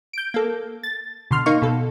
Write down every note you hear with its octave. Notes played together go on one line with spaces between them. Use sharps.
G6 D7
A#3 A4
A6
B2 D3 C6 F6
A#3 D#4 F5 C#6
B2 A4